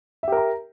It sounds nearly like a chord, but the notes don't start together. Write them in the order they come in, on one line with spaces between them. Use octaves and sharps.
E5 G4 A#4 A#5